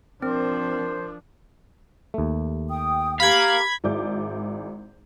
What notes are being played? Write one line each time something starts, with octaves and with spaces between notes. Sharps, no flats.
F3 C4 D4 A#4 C5
D#2 A3
G5 D#6
G4 A#4 F5 B5 G#6
G#1 E4 G#4 D5 D6 G6